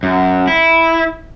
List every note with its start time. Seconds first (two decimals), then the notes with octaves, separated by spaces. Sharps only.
0.03 F#2
0.47 E4